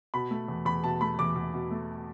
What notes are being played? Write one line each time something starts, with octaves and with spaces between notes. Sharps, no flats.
B2 B5
A3
E2
E2 B5
B2 A5
A3 B5
E2 D6
E2
B2
A3